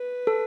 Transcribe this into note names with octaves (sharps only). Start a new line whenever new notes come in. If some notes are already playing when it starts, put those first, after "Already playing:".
Already playing: B4
A4